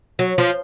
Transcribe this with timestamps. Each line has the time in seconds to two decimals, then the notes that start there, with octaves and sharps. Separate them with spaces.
0.19 F#3
0.38 F3